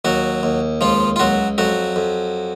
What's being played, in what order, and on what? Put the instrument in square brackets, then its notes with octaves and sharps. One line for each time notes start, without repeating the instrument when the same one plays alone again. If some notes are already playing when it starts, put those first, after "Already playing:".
[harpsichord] D#2 F#3 F#4
D#2
C#2 F3 F4
F4
C#2 F#3 F#4
F2 F#3 F#4
F2